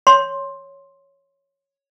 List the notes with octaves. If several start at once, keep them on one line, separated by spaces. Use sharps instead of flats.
C#5 C6